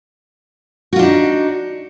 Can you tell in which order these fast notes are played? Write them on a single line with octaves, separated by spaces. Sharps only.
F#4 F4 D4 D#4